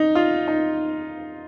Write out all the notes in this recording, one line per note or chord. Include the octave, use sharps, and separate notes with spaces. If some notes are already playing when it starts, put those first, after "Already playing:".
Already playing: D#4
F4
D#4